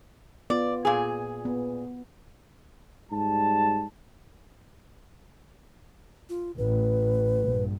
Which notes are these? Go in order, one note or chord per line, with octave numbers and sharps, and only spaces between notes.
B3 F4 D5
A#2 G#4
B3
G#2 G3 A5
F4
A1 B4
A#1 G2